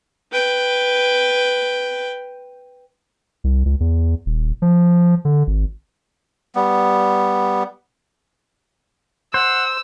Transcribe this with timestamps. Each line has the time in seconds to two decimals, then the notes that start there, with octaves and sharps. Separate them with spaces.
0.32 B4 G5
3.44 C2
3.65 C#2
3.80 E2
4.26 D#1
4.62 F3
5.25 D3
5.47 G#1
6.55 G3 B3
9.34 C5 F#5 E6